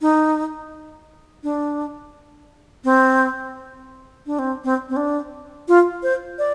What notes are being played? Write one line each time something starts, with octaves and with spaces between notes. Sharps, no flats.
D#4
D4
C4
D4
C4
C4
C4
D4
F4
C5
D5